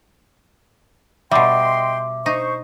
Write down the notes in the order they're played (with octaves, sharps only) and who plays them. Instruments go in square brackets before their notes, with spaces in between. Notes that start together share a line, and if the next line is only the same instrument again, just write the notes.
[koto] B2 G3 [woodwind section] D#5 G5 C6 [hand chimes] E5 D6
[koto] D#4 [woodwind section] C5 C#6